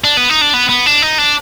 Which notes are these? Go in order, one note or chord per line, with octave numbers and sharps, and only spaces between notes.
D4
B3
D#4
D4
B3
B3
D4
D#4
D4